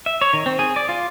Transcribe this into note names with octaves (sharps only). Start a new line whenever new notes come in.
E5
C#5
D#3
C4
G#4
D5
F4